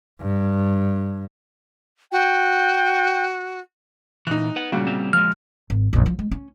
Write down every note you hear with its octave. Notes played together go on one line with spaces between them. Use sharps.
G2
F#4 G5
A#2 E3 D#4 F#6
B4 F#5
A#2 C#3 G3 F#4
G3 C4
F3 G#3 F6
G#1
A#1 F#2
F3
G#3
C#4